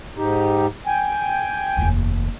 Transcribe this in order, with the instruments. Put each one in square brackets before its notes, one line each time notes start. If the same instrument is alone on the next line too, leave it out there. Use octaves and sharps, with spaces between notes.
[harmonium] G#2 D#4 G4
G5 G#5
[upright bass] F1 D#2